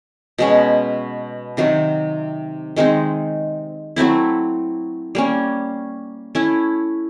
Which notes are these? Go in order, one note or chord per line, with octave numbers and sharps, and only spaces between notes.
B2 G#3 C#4
C3 D#3 F#3
D#3 G#3 C4 D#4
F#3 A3 C4 E4
G3 A#3 C#4
A3 C#4 E4